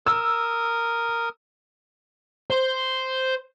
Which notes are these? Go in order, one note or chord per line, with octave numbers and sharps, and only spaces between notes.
A#4 D#6 E6
C5